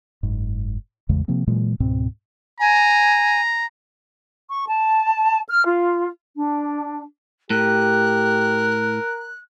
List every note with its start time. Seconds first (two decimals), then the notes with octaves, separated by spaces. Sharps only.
0.23 F#1 G#2
1.09 A1 E2 C#3 G#3
1.28 C3 F3 A#3 C4
1.47 A#2 E3 F#3 G#3
1.80 C#2 G#2 B2 C4
2.60 G#5 A#5
4.50 C#6
4.67 A5
5.49 F6
5.65 F4
6.35 D4
7.50 A2 G4 A#4 F#6